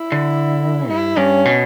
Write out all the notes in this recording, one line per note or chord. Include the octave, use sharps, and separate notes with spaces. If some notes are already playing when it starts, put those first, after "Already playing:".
Already playing: E4
D3
G2 E4
G2 C#4
B2